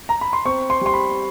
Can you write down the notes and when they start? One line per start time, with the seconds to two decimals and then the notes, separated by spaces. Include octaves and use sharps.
0.09 A#5
0.21 B5
0.33 C6
0.46 C4 C#6
0.70 C6
0.81 G3 C6
0.93 B5